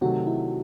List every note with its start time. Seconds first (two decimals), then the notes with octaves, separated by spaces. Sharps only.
0.01 C3 D#3 F#3 A3 F#4
0.27 E4